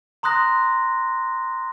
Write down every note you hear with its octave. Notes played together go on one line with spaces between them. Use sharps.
A#5 C6 D#6 F#6 A#6